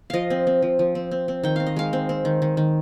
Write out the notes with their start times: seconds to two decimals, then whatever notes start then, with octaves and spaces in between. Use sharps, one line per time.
0.10 F3 D#5 F5
0.30 C4
0.47 C4
0.62 F3
0.79 F3
0.95 C4
1.11 C4
1.28 C4
1.43 D#3 G5
1.56 C4 F5
1.66 D#5
1.76 G#3 F5
1.93 C4
2.09 C4
2.25 D#3
2.42 D#3
2.57 D#3